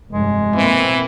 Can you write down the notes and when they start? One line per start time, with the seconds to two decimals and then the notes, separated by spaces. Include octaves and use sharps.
0.13 F1 G2 G#3
0.55 B2 E3 A#3 C4